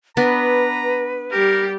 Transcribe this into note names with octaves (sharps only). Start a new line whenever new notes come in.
B3 D4 B4 A#5
G3 G4 A#4